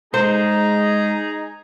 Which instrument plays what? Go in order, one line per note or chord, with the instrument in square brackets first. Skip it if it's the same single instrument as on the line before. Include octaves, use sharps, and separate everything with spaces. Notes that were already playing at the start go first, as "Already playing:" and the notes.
[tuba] G#3 [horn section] D#4 G#4 [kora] C5 [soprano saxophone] A#5